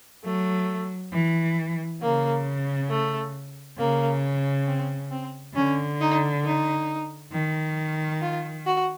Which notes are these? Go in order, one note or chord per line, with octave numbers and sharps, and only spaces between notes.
F#3 A3
E3
C#3 A#3
A3
C#3 A#3
C4
C4
D3 C#4
D#4
D#4
D#3
F4
F#4